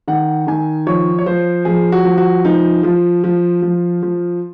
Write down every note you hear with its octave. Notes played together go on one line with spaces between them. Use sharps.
D#3 F#5
D#3 G#5
F3 C#5
C#5
F3 C5
F3 G#4
F#4
F3
F#4
F3 D#4
F3 F4
F3
F3
F3